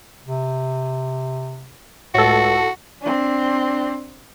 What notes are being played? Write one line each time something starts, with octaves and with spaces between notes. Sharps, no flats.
C3
C#2 A2 F#4 A4
C4 D4